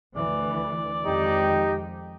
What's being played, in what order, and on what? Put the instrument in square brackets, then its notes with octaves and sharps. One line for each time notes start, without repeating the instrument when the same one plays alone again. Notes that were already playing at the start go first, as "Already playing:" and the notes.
[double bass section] D2 E3 [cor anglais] D5
[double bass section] F2 D#3 G#3 [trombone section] D#4 G4